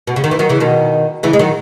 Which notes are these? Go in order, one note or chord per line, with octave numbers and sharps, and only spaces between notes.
B2
C#3
D#3
E3
D#3 F#3
C#3 E3
B2 D#3
C#3 E3
G#3
D#3 F#3